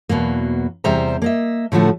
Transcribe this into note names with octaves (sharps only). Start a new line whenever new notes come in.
E2 B2 F#3 A#3
E2 C3 G3 C5 E5 A#5
A#3 D#5 E5
A2 D3 F3 A3 F#4